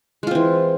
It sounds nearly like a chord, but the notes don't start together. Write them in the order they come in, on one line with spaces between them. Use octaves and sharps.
G#3 F4 C4 E3